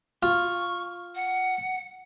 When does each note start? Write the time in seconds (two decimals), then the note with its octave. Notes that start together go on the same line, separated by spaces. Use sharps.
0.23 F4 C#6
1.15 F#5